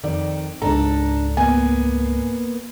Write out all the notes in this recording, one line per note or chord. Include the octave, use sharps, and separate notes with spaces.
F2 D#3 D5
C#2 G#2 D4 A4 A#5
A#3 B3 G#5